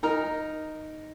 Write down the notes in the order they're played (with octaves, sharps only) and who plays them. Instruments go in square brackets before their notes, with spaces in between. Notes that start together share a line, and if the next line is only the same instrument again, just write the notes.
[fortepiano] D#4 A#4 A#5